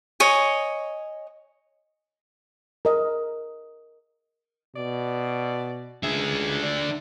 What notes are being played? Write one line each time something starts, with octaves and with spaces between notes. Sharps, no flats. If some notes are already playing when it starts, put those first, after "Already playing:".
C#5 D#5 G#5
A#4 D#5
B2 D5
C#2 D3 G#4 E5
D5